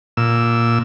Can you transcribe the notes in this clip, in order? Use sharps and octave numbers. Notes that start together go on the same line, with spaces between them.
A#2 E6